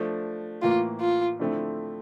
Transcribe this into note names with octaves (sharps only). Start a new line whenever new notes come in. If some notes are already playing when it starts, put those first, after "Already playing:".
Already playing: F3 A3 D4
A2 E3 A#3 F4
F4
D3 F3 A3 C4 E4